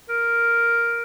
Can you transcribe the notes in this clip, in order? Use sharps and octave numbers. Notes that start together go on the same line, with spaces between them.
A#4